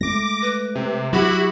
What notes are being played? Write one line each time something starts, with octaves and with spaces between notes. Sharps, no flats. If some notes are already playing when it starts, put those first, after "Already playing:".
G#3 A3 D6 A#6
B4
C3
F#3 E4 F#4 G4 B5